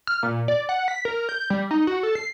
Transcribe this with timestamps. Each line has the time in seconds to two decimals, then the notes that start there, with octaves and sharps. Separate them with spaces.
0.07 F6
0.23 A#2
0.48 D5
0.69 F#5
0.88 B6
1.05 A#4
1.29 G6
1.50 G3
1.71 D#4
1.87 F#4
2.03 A4
2.15 C7